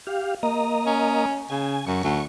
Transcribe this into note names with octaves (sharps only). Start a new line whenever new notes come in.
G4 F5
A#3 D#5 A#5
C#4
C#3 G#5
F#2 C#6
D2